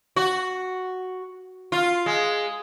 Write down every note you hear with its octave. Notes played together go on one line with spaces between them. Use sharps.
F#4
F4
G#3